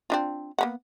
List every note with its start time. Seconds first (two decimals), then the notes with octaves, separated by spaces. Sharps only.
0.10 C4 D4 F4
0.59 A#3 B3 F#5